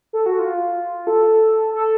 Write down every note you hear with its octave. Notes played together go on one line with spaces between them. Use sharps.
A4
F#4
F4
A4
A4